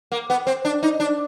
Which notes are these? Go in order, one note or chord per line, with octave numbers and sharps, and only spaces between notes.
A#3
B3
C4
D4
D#4
D4